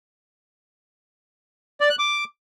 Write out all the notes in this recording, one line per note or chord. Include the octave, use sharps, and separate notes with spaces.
D5
F#6
D6